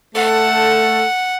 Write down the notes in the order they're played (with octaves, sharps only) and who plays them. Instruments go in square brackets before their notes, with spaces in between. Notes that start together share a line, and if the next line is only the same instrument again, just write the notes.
[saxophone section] A3 A4 [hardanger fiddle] F#5